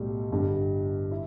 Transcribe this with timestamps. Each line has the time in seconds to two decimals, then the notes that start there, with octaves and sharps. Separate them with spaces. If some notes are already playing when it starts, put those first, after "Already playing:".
Already playing: B1 A2 G3
0.31 G1 G2 D3 G3
1.11 E4